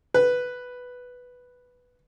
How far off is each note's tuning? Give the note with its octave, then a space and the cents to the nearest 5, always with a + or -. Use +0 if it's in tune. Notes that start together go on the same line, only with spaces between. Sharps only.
B4 +0